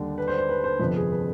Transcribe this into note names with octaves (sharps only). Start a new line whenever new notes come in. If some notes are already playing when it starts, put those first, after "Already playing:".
Already playing: D#2 D3 G3 D4
B4
C5
C5
B4
C5
G1 F2 C3 F3 B4
G#4
B4